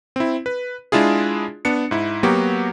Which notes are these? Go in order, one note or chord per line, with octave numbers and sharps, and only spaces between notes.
C4 E4
B4
G#3 D4 E4 F4 G#4
B3 D4 C#7
G#2 E4
F#3 A#3 B3 F#4 G4